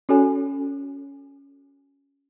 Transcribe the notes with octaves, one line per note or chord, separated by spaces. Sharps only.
C#4 F#4 A4 C#5 G#5